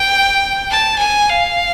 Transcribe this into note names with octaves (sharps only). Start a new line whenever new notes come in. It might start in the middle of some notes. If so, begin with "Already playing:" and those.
Already playing: G5
A5
G#5
F5